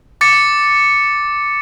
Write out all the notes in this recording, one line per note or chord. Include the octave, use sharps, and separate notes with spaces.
D6 A6 C#7